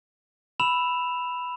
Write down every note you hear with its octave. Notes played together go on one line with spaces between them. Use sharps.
B5 E6 E7 F7